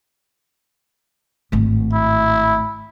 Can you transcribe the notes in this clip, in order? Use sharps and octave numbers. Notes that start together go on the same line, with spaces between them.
G#1 A2
E4